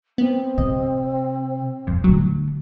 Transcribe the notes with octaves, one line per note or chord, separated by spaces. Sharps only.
B3 C4
C3 D#5
D#1 F2
D3 F#3 A3